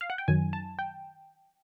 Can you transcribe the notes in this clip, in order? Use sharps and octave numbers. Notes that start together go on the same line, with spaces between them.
F5
F#5
G5
F#2 D#3 F#3 G#5
A5
G5